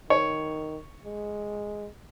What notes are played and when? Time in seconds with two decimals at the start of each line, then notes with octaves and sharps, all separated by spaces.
0.10 D#3 C#5
1.05 G#3